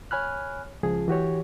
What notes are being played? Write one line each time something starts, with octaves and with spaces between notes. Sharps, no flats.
C#5 G#5 B5 F6 F#6
C#2 F3 G#4
E3 F#4 G4 C#5